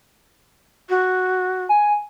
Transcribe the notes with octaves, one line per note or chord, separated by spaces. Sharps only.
F#4
G#5